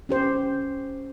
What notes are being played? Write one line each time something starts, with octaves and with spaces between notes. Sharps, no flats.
C#4 G4 C5